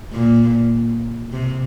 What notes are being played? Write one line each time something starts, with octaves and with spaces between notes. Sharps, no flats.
A#2
C3